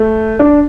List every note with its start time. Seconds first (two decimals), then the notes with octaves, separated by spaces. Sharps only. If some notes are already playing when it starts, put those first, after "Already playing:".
Already playing: A3
0.39 D4